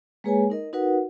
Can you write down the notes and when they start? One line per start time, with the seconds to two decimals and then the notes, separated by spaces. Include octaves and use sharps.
0.24 G#3 A#3 G#4 B4 C#5 G#5
0.50 D#4 A#4 D#5
0.73 D#4 F#4 A#4 B4 F#5